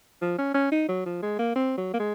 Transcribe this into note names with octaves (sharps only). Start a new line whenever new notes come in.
F3
C#4
C#4
D#4
F#3
F3
G#3
A#3
C4
F#3
A#3
G#3